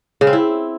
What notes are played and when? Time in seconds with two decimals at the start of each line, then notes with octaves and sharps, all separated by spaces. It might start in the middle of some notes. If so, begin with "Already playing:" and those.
0.21 C#3
0.27 C4
0.33 E4